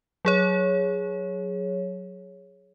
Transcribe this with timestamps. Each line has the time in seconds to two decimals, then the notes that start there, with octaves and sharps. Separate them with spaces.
0.25 F#3 G#4 C#5